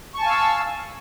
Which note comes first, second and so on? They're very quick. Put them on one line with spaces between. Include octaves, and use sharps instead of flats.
C#6 A5 G#5 F5 E6